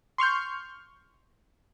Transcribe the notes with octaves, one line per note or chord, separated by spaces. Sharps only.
C6 C#6 F6 G6